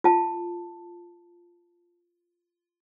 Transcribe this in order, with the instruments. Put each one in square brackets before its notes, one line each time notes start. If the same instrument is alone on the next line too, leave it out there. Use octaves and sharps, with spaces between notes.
[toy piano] F4 A5